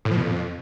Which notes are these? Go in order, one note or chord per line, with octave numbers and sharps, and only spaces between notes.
A2
F3
B2
F2